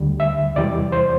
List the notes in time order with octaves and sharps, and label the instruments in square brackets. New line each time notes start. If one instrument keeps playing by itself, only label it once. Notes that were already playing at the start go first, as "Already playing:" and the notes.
Already playing: [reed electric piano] D2 D3 G3
E5
E2 C3 E3 G3 D5
C5